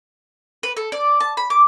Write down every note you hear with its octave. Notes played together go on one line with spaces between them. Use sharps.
B4
A4
D5
A5
B5
D6